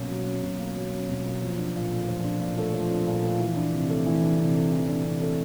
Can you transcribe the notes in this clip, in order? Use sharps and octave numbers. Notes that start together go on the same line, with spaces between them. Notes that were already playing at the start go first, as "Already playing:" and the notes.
Already playing: B2 F#3 A#3 C#4
F#3
C#4
B2
A#3
F#3
C#4
B2
A#3
F3
D4
A#2
A3
F3
D4
A#2
A3
F3
D4
A#2
A3
E3
D4
C3
A3
E3
D4
C3
A3
E3
D4
C3
A3